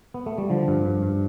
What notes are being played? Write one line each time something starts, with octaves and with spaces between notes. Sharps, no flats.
B3
A3
G3
D3 F3
G2
G2
G2